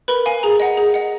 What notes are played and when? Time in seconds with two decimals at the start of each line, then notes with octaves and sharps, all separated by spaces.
0.08 A#4 B4 B5
0.26 F5 G#5
0.43 G#4 A#5
0.60 D#5 F#5
0.77 G#4
0.94 D#5 F#5